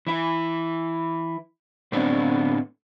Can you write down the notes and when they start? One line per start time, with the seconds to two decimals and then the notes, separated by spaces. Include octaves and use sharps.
0.07 E3 E4
1.92 A2 D3 A3 B3 C4 D4